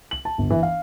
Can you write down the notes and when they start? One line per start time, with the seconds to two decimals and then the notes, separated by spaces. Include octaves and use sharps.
0.11 F#7
0.25 A5
0.38 G1
0.50 E3
0.63 F5